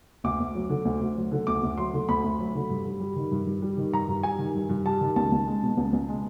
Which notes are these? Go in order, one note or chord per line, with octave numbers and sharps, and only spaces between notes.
D2 D6
D2
F#3
D3
D2
D2
F#3
D3
D2 D6
D2
F#3 C6
D3
D2 B5
D2
F#3
D3
G2
G2
G3
D#3
G2
G2
G3
D#3
G2 A#5
G2
G3 G#5
D#3
G2
G2
G3 A5
D#3
C#2 A5
C#2
G#3
B2
C#2
C#2
G#3